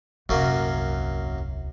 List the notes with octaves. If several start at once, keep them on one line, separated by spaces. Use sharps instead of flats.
D#1 C2 F#2 F#3 A#3